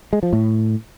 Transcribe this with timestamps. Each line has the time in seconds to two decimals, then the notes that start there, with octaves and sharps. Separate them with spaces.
0.13 G#3
0.23 F3
0.33 A2